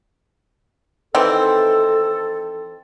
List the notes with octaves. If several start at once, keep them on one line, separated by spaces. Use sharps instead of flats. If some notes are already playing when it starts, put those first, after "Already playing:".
D#3 E3 C4 A4